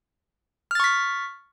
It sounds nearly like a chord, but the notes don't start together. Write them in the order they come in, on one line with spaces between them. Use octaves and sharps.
F6 A6 C#6 B6